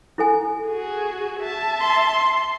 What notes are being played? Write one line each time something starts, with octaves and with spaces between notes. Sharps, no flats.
E4 A4 G#5
F#4 G#4
E5 A5
C6